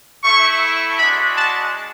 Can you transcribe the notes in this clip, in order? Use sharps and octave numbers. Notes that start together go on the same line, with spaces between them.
A3 E4 C#6
G#3 D4 F#4 B5
A5